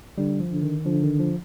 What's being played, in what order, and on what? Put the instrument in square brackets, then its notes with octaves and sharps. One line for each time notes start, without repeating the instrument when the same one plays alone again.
[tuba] D3 [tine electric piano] G3
[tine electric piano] F3
[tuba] D3
[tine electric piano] D#3
[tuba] D3 [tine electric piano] F3
[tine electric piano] D#3
F3